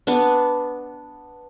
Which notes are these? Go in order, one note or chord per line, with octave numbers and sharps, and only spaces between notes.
B3 D4